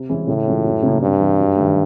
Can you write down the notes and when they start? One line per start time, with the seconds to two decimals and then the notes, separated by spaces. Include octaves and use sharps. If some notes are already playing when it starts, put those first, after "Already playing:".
Already playing: C3
0.09 E3 G#3 C#4
0.27 A2 C#3
0.47 E3 G#3 C#4 F4
0.65 F#2
0.83 C#3 F#3 A#3
1.01 G2 C3
1.19 E3 G3
1.38 F#2
1.57 D#3 F#3 A3